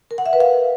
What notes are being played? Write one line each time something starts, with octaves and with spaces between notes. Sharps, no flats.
A#4
F#5
E5
B4
F5